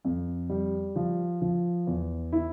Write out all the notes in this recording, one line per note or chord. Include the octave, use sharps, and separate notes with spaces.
F2
G3
F3
F3
E2
E4